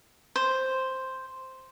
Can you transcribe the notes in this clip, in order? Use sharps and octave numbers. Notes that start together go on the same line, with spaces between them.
C5